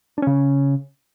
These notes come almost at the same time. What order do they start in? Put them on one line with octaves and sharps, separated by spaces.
D4 C#4 C#3